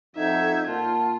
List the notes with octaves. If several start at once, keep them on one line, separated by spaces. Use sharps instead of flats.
F2 D#4 A4 E5 F#5 G6 G#6
A#2 F4 F#5 A5